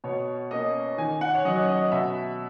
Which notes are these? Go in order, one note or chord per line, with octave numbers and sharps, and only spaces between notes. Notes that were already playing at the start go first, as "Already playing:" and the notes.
B2 C#5
A#3 C#4 D#5
D#3 G#5
F#5
C#5
F#3 C#4 D#5
C#5
D#5
B2 E5